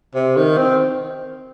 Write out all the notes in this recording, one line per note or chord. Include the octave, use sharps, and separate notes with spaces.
C3
D#3
C4